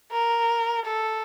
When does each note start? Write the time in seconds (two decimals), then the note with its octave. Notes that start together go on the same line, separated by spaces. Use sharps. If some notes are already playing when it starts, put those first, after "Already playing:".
0.12 A#4
0.86 A4